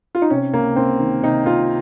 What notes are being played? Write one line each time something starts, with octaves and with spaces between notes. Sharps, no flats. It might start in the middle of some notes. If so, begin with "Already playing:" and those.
F4
D#4
C3 C#4
C#2 A#3
C#2 C4
D#3
C3 D#4
C3 F4